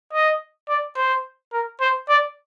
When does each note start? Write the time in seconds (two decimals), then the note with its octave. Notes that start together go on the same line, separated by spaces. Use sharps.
0.13 D#5
0.69 D5
0.97 C5
1.53 A#4
1.81 C5
2.09 D5